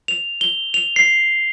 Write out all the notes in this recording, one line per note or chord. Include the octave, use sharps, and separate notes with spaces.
F7
G7
F7
C7